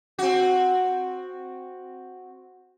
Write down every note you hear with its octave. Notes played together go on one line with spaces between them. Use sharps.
C4 F#4